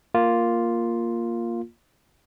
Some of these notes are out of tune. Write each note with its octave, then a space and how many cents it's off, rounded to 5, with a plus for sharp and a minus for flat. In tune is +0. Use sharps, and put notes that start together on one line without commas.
A#3 +0 F4 +0